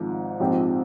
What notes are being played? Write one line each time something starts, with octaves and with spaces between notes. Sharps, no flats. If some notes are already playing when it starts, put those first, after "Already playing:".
Already playing: G#1 G#2 F3
A#1 G#2 F3 C4 G4